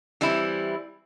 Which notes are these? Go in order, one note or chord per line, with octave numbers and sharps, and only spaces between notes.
E3 G3 C4 E4